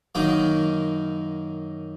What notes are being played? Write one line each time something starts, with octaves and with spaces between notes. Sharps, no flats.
F#2 D#3 A#3 D#4